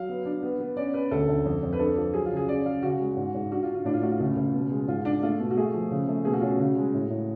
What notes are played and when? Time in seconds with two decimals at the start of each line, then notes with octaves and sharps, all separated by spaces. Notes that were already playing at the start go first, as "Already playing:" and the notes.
Already playing: F#3 F5
0.09 B3
0.25 D4
0.43 B3
0.60 B3
0.77 C#4 D5
0.94 C#4 B4
1.11 D2 A4
1.28 D2
1.45 F2
1.63 F2
1.73 B4
1.79 D4 A4
1.97 F3
2.14 F#3 G#4
2.25 F4
2.32 C#3
2.37 G#4
2.48 C#4 D5
2.66 C#4 F5
2.83 C#3 F#4
2.99 G#3
3.17 G#2
3.35 G#2
3.51 D4 F#4
3.62 F4
3.68 D4
3.74 F4
3.85 A2 D4
3.94 F4
4.02 A3 F#4
4.11 F4
4.20 C#2
4.37 C#2
4.54 B2
4.71 G#3
4.88 G#2 F4
5.05 D4
5.23 A3 F4
5.40 B2
5.51 F#4
5.57 A3 G#4
5.74 F3
5.91 C#3
6.08 A3
6.25 B2 G#4
6.33 F#4
6.40 C#4 F4
6.47 F#4
6.59 C#3
6.76 G#3
6.94 A2
7.10 A2